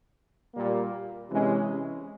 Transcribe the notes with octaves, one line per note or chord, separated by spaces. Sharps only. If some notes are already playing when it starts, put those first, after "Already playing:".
A#2 G3 A#3
C3 E3 G#3 C#4